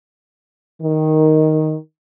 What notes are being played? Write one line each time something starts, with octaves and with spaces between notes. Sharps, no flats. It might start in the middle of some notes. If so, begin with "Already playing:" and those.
D#3